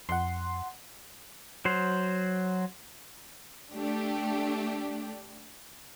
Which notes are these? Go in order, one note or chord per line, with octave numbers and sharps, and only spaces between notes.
F2 F#5 C6
F#3 C5
A3 D4 G4